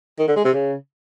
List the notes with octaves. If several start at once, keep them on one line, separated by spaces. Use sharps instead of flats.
D#3
D3
G#3
C3
C#3